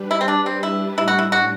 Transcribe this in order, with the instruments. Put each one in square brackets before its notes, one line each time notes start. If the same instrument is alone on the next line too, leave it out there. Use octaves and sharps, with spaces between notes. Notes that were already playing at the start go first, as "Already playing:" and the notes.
Already playing: [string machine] G3 D4 G4 B4
[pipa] E4
C4
D4
C4
E4
[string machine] A2 G3 D4 [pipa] E4
[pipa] F#4
E4
F#4